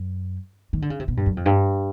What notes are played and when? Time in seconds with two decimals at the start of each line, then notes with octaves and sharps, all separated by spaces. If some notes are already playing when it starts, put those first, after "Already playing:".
Already playing: F#2
0.73 D#3
0.82 D3
0.90 C#3
1.00 C3
1.08 B2
1.17 G2
1.26 F#2
1.37 F2
1.46 G2